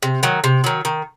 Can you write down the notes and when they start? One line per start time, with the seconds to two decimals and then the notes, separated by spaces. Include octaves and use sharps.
0.03 C3
0.23 D#3 F#3
0.44 C3
0.64 D#3 F#3
0.85 D#3